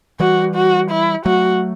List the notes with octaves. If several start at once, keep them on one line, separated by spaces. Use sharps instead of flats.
E3 G3 F#4
F#4
E4
F#3 A3 F#4